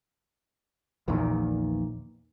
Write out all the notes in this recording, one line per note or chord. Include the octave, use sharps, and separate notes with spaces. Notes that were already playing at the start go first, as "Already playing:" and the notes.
A#1 E2 A#2 D#3